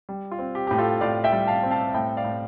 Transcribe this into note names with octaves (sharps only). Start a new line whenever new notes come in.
G3
F4
C4
G4
A2 G4
F4 A4
A2 D5 F5
E5 G5
G3
F5 A5
C4
F5 A5
A2 E5 G5
D5 F5
A2